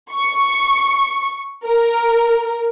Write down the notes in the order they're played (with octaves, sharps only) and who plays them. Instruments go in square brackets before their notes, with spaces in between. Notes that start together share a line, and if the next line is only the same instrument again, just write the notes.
[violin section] C#6
A#4